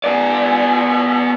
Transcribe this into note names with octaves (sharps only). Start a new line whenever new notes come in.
B3 D5